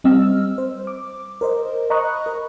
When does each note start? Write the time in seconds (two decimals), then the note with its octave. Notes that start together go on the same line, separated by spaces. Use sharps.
0.04 G3 C4 D#5 E6 F6
0.58 C5
0.87 D6
1.41 A#4 C5 D#5
1.90 D#5 A#5 B5 C#6 D#6 F#6
2.26 A#4